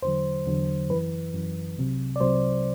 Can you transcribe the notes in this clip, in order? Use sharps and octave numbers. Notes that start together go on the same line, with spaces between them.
E2 D3 F#3 C5
E2 D3 F#3
F#2 E3 B4
F#2 E3
C2 C3 F#3
D5
C2 C3 F#3 C5